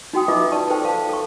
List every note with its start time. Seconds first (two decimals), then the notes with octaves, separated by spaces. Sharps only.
0.13 D#4 F#4 G5 D#6
0.28 F4 B4 D#5 E5 D6
0.52 D#4 B4 D5 A5 C#6
0.70 A4 B4 C5 G5
0.85 F5 A5
1.09 A4 C#6